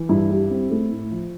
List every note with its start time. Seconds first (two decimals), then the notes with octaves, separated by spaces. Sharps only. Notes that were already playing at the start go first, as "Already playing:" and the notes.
Already playing: E3
0.09 G2 E4
0.30 G3
0.50 C4
0.70 A3
0.91 A2
1.11 F3